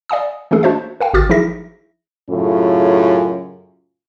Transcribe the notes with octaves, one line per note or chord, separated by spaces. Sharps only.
D5 F5 G#5 D#6
E3 A3 A#3 C#4 G#4 A4
D4 F#4 C5 D#5 E5
A#4 F5 G5
G#1 D3 F#4 D6 F6 A6
F3 D#4 E4 G#4 E5 A#6
F#2 A2 C#3 C#4 F4